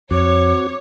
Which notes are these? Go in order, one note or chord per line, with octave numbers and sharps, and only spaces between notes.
F2 C4 F#4 C#5 D6